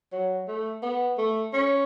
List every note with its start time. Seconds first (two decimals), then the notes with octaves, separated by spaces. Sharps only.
0.13 F#3
0.48 A3
0.82 B3
1.18 A3
1.53 C#4